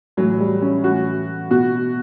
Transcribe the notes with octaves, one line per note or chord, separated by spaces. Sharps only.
A2 E3 F#3
G3
C#4
A2 E3 F#4
B2 F#4